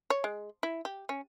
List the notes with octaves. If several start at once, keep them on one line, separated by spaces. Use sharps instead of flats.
C#5
G#3
E4
G4
C#4